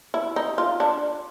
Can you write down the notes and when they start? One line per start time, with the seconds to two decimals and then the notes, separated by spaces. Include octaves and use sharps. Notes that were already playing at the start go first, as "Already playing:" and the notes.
0.14 E4
0.36 D#4
0.58 F4
0.80 D4